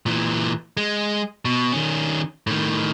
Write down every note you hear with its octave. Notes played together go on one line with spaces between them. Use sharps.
A#2 E3
G#3
B2
D#3 C#4
A2 D#3